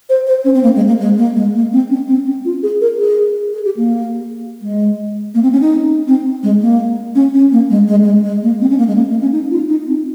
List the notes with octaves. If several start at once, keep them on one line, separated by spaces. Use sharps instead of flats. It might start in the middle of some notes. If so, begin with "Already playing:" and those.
C5
C5
C#4
C4
A#3
G#3
A#3
G#3
A#3
G#3
A#3
C4
C#4
C4
C#4
F4
G#4
A#4
G#4
G#4
G4
A#3
G#3
A#3
C4
C#4
D#4
C4
G#3
A#3
C#4
C#4
A#3
G#3
G#3
G#3
G#3
A#3
C4
C#4
A#3
G#3
A#3
A#3
C#4
D#4
F4
D#4
C4